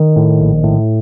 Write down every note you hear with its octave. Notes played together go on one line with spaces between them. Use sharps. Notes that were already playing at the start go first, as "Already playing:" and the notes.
Already playing: D#3
A2
A#1
A2